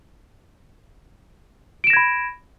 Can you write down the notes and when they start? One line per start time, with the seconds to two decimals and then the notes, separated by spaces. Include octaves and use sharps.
1.84 D7
1.87 E7
1.90 A#6
1.93 G#6
1.97 B5